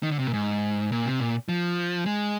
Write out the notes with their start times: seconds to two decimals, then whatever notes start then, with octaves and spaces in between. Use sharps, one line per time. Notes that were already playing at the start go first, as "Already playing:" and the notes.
0.03 D#3
0.11 D3
0.19 C3
0.27 A#2
0.34 G#2
0.92 A#2
1.06 C3
1.20 A#2
1.49 F3
2.06 G#3